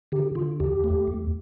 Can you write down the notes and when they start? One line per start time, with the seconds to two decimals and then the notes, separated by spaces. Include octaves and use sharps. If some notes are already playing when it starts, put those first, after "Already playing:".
0.12 D3 G4
0.35 D3 F4
0.60 E2 G4
0.84 A3
1.07 E2